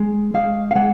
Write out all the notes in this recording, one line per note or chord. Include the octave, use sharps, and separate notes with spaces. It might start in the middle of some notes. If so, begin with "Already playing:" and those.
Already playing: G#3
G#3 F5
F5
G#3 F#5